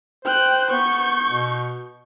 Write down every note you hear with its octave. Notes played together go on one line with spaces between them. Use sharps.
C5 G5 F#6
B3 C#6 G6
B2